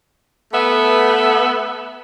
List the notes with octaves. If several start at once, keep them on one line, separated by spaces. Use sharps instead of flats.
A3 B3 B4 E5